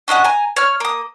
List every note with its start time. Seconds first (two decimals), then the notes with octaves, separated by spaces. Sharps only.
0.08 C#4 D4 D#5 F#5
0.24 G#5 A#5
0.56 C#5 F6
0.80 A#3 D#6